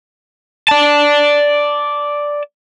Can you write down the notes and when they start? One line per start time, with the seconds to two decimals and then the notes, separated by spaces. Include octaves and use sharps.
0.68 D5 A5